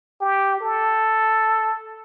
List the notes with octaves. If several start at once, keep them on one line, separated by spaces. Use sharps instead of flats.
G4
A4